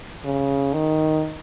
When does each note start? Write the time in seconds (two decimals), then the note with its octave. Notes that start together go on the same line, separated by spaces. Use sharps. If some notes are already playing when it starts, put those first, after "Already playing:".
0.25 C#3
0.74 D#3